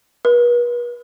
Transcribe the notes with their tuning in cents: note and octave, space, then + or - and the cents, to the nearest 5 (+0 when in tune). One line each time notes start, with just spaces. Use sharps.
B4 -40